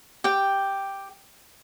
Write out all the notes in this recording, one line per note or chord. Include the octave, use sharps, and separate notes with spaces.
G4 G5